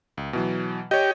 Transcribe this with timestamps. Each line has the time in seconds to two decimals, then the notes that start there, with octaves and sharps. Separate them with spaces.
0.17 C#2
0.33 B2 E3 F#3
0.91 G4 C#5 D#5